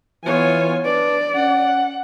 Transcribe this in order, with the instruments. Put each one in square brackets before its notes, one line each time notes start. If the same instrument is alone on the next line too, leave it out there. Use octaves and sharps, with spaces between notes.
[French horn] E3 [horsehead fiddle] B3 C#5 [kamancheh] F4 G#5
[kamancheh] D4 [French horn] B4 [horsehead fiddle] D5
[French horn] C#4 [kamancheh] F#5